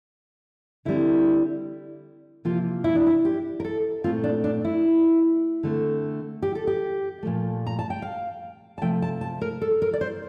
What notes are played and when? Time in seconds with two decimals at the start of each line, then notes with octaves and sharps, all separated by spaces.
0.85 D3 G3 C4 E4
2.45 C3 F3 A#3 F4
2.84 E4
2.95 D4
3.07 E4
3.25 G4
3.60 A#4
3.65 A4
4.04 A#2 A3 C4 F4
4.24 D4
4.44 D4
4.65 E4
5.63 D3 A3 C4
6.42 G4
6.55 A4
6.67 G4
7.23 A#2 F3 A3
7.67 A#5
7.79 A5
7.90 G5
8.02 F5
8.78 A5
8.81 C3 F3 A3 G5
9.02 A5
9.21 A5
9.41 A#4
9.61 A4
9.82 A#4
9.93 D5
10.01 C5